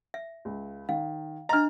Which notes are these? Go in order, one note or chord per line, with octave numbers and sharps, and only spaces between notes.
E5
C#2
D#3 F5
D4 D#5 A#5 F6